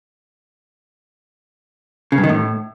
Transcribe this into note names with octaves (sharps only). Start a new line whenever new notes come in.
C#3
G2
D#3
A2